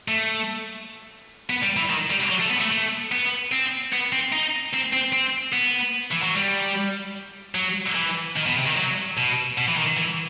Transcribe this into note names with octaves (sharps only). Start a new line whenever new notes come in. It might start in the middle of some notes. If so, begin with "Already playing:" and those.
A3
B3
G3
E3
D#3
G3
F#3
A3
B3
A3
A3
B3
C4
B3
C4
D#4
C4
C4
C4
B3
E3
F#3
G3
F#3
E3
D#3
B2
C3
D#3
F#3
B2
B2
E3
D#3
E3